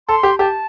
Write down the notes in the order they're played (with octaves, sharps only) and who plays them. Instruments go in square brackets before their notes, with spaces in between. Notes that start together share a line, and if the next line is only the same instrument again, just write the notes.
[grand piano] A4 [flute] C6
[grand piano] G4
[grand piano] G4 [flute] A5